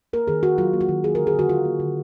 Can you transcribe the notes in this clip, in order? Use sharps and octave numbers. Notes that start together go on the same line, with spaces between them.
A#3 A#4
D#3 G#4
D#3 F#4
F#3 F4
A#3
F#4
D#3
A#3 G#4
A#4
D3
G#4
D3 F#4
F#3 F4
A#3
D3